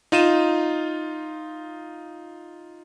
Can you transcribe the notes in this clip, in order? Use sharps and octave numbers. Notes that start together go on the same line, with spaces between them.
D#4 F4 D#7 E7